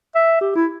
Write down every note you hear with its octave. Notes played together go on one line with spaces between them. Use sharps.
E5
G4
E4